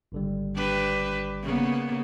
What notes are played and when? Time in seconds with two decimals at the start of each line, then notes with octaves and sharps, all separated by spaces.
0.12 G#1 D3 G3
0.56 D4 G4 B4
1.43 C#3 A#3 B3